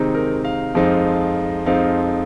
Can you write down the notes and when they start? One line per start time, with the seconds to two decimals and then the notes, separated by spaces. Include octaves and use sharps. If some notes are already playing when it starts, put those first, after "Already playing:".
Already playing: C3 D#3 G#3 C4 D#4
0.14 A#4
0.45 F5
0.75 F2 F3 G#3 C4 D#4
1.66 F2 F3 G#3 C4 D#4 F5